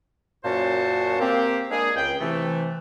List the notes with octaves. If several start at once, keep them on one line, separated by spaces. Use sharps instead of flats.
F#2 A#2 C#4 F#4 C5 A5
A#3 C4 G4
G#3 A#3 D4 G#4
C#2 G5
C3 E3 A3